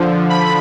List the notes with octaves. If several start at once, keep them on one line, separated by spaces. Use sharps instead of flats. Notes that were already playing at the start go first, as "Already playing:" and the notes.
Already playing: D3 F3
B5